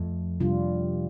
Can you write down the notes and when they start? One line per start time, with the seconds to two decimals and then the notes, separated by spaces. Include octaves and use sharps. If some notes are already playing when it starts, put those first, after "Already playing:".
Already playing: F2 A3
0.40 C3 G3 D4 F4